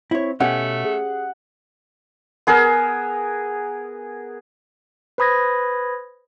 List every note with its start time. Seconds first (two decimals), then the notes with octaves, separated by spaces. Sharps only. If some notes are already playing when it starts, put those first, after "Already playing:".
0.11 C4 E4 C#5
0.40 B2 A3 C#4 G4 F#5
0.85 G#4
2.47 B3 G#4 A#4 E6
5.18 B4 C5 B5 D#6 G#6 A#6